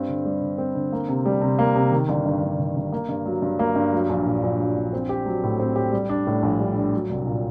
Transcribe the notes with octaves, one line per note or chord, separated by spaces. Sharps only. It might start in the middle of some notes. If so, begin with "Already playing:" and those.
Already playing: G2 C4
D3
G3
D3
C4
D3
A#3
C3
G3
C3
A#3
C3
D#3
G1
G2
G1
D#3
G1
A#3
G2
F#3
G2
A#3
G2
F#3
A#1
A#2
A#1
F#3
A#1
C4
G4
F#3
A2
C4
G4
G3
D4
A2
A#1
G3
D4
F#3
C2
A#2